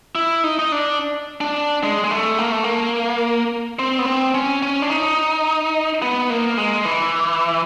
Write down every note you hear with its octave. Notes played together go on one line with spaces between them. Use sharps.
E4
D#4
D#4
D4
D4
G#3
G#3
A3
A#3
A3
A#3
C4
B3
C4
C#4
C#4
D4
D#4
B3
A#3
G#3
E3